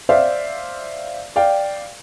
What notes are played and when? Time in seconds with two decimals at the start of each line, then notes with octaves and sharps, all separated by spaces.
0.09 C5 D5 E5 F5
1.36 D5 F5 G5